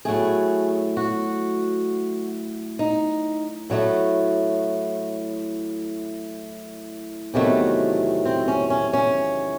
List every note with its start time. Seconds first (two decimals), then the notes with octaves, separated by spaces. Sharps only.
0.05 A2 F#3 A3 G#4
0.97 F#4
2.79 D#4
3.70 A2 F#3 A3
7.34 E2 C3 D#3 F#3 A3
8.25 C4
8.48 C#4
8.70 C#4
8.93 C#4